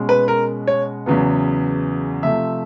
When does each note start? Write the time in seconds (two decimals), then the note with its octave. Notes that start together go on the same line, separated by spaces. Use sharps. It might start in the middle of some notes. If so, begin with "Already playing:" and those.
Already playing: B2 G#3 C#4
0.09 B4
0.28 A#4
0.67 C#5
1.06 E2 C#3 F#3 B3
2.23 C3 F3 A3 E5